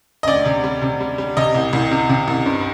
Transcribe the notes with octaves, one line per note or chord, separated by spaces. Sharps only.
D#5
D2 D5
C3
G3
C3
G3
G3
C3 D#5
C2
C2
C3
C3
C2
G2